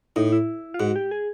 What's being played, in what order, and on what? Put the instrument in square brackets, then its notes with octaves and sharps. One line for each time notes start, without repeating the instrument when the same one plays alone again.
[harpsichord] A2 [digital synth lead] D#4
[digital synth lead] E4
F4
[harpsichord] G#2 [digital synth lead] F#4
[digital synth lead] G4
G#4